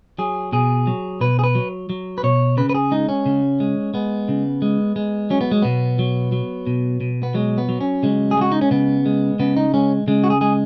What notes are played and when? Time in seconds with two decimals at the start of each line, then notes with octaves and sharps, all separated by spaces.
0.18 F#3 G#4
0.52 B2 G#4
0.87 F#3
1.21 B2 B4
1.39 G#4
1.44 B4
1.55 F#3
1.90 F#3
2.18 B4
2.23 B2 C#5
2.57 C#3 B4
2.70 B4
2.75 G#4
2.91 G#3 D#4
3.09 C#4
3.26 C#3
3.60 G#3
3.94 G#3 B3
4.29 C#3
4.62 G#3
4.96 G#3
5.30 F#3 C#4
5.41 B3
5.52 G#3
5.62 B2 B3
5.99 F#3
6.32 F#3
6.67 B2
7.01 B2
7.23 B3
7.34 F#3 G#3
7.58 B3
7.69 F#3
7.81 C#4
8.03 C#3 G#3
8.31 G#4
8.37 G#3 F#4
8.52 D#4
8.61 C#4
8.71 C#3 B3
9.06 G#3
9.39 C#3 B3
9.57 D#4
9.74 G#3 C#4
10.08 C#3 G#3
10.24 F#4
10.30 G#4
10.41 G#3 G#4